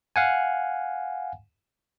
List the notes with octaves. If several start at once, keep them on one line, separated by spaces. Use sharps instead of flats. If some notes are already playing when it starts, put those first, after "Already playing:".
F5 F#5 G#5